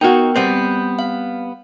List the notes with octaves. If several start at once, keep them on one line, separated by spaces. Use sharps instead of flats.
B3 D#4 F#4 A#4 G5
G3 B3 C4 G6
F5